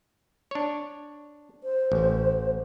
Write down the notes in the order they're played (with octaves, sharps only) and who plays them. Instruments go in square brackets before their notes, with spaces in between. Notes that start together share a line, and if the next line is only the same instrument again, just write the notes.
[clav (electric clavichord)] D4 C#5
[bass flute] C5
[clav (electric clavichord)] A1